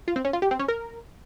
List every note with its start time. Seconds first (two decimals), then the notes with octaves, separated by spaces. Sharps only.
0.08 F4
0.16 C4
0.25 C#4
0.33 F4
0.42 G4
0.51 C4
0.59 C#4
0.68 A#4